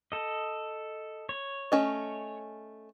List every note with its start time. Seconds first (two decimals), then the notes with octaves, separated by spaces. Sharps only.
0.12 A4 D#5
1.29 C#5
1.72 A3 C#4 D#5